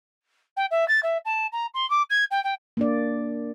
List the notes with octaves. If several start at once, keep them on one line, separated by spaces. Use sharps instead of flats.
G5
E5
A6
E5
A5
A#5
C6
D6
G#6
G5
G5
A#3 D4 D5